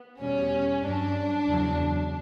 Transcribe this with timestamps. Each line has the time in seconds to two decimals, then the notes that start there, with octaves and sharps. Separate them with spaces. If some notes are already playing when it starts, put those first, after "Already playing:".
Already playing: B3
0.19 E2 B2 G3 C#4
0.83 G2 F#3 D4
1.47 E2 C#3 F#3